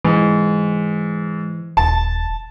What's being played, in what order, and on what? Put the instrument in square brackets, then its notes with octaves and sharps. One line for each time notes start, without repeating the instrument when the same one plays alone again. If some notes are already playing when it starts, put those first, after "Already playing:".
[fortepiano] G#2 [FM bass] E3
[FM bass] D#1 [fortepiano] A5